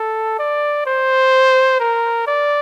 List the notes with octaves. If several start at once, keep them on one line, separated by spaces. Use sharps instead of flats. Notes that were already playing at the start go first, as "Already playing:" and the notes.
Already playing: A4
D5
C5
A#4
D5